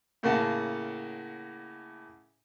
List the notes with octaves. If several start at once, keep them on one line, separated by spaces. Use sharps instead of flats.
A2 C#3 A#3 F5 F#5 A5